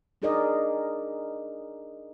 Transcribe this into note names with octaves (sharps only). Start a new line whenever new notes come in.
D4 D#4 G#4 A#4 D5 D#5